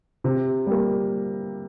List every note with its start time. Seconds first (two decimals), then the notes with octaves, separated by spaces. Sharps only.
0.24 C3
0.67 G3 A#3